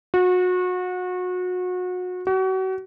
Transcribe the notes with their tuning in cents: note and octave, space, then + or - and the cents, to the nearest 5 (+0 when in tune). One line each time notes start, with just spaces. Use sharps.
F#4 -30
F#4 +35